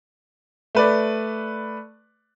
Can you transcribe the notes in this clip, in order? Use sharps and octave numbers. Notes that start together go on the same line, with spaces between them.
A3 B4 D5